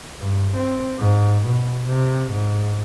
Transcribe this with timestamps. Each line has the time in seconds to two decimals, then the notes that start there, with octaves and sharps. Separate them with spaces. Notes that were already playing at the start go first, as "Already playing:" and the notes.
0.20 G2
0.56 C4
0.99 G#2
1.45 B2
1.87 C3
2.32 G#2